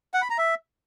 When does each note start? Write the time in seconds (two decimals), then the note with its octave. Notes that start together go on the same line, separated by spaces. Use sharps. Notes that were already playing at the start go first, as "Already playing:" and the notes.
0.14 F#5
0.22 B5
0.30 A#5
0.38 E5